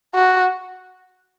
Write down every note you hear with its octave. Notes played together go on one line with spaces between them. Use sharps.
F#4